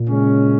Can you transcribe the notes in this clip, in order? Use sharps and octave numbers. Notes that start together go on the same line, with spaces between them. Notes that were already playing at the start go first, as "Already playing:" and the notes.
Already playing: A#2
C#3 G#3 C#4